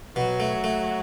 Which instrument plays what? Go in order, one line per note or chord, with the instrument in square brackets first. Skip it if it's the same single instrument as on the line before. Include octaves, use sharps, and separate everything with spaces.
[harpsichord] B2 [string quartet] F#3 F#4
[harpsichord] A3
A3